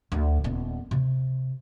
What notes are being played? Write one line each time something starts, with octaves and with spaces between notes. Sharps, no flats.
D2
D#1 B3
C3